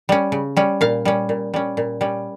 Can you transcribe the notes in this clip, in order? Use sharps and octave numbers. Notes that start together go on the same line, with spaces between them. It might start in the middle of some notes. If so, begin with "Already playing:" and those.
G3 C#4
C#3
G3 C#4
A#2 F5
G3 C#4
A#2
G3 C#4
A#2
G3 C#4